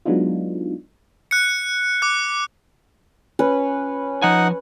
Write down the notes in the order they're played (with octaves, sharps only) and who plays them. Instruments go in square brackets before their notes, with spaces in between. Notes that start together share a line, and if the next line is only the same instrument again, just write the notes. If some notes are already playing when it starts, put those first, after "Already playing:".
[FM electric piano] F#3 G#3 B3 D4 D#4 F4
[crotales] F#6 C#7
D6 F#6
[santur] C#4 B4 C#5
[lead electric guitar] F3 G#5 [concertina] D#4 F#5